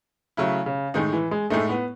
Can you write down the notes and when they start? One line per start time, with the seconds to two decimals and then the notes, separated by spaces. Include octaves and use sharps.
0.37 C#3 F#3 A3 E4
0.66 C#3
0.94 A2 D#3 G#3 D#4
1.12 E3
1.31 G#3
1.50 A2 G#3 A3 D#4
1.69 B3